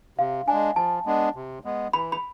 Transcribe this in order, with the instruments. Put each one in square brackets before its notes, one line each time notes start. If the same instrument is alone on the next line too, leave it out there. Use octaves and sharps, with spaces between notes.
[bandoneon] C3 [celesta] F5
[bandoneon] D4 [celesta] G#5
[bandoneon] G#3
[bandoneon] F3 [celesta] A5
[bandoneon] G#3 B3 D4
C3
G#3 B3
[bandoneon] E3 [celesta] B5
[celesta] B5